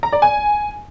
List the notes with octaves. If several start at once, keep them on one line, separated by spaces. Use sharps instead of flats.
A#5
D5
G#5